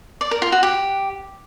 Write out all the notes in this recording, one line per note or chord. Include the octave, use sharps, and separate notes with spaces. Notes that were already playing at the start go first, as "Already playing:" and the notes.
D5
A#4
F4
F#4
G4